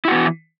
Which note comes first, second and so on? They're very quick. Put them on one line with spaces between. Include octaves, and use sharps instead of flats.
E4 F#4 B3 E3